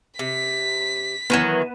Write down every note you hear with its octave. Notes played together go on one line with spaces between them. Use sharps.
C3 B6
D#3 E3 F#3 B3 D#7 E7